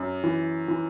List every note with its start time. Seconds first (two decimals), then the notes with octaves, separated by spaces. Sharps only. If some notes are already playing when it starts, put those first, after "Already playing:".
Already playing: F#2
0.24 E3
0.68 E3